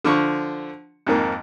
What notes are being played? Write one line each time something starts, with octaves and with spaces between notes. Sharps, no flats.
D3 F3 C#6
F2 G#2 D#3 A#3